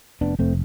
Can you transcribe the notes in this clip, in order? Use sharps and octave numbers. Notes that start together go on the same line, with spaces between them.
F1 B3 D4
F1 A3 C4